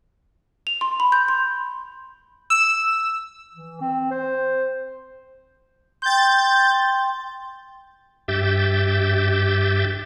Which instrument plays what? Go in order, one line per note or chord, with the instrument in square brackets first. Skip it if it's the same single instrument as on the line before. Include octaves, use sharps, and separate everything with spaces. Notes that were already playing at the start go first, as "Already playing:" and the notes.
[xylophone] F7
C6
B5
G6
C6
[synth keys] E6
[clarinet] E3
C4
C5
[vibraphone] G5 C6 [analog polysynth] G6 A6
[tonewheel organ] G2 G4 E5 G6 A6